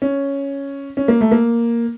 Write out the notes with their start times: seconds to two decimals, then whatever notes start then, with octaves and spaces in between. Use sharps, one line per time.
0.02 C#4
0.97 C#4
1.08 A#3
1.21 A3
1.31 A#3